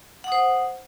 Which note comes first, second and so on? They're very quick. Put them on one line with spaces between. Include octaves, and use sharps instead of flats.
F#5 D#6 C5